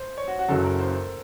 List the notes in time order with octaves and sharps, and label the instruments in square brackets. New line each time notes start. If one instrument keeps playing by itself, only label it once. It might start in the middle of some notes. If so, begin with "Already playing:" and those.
Already playing: [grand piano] C5
C#5
F#4
F#4
[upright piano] F#1 F#2 C#3 F#3 [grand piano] A4
[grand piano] A#4
C5